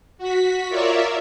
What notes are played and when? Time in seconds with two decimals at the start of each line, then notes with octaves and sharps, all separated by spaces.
0.18 F#4 B6
0.69 F4 A#4 C#5 D5 E5